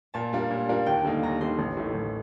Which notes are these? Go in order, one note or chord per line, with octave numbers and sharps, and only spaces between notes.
A#2 A5
G3 D4 F4 A#4
A#2
G3 D4 F4 A#4
D#2 G5
D3 G3 A#3 D#4
D#2 A#5
D3 G3 A#3 D#4 C6
A1
A2 A3 D#4
A1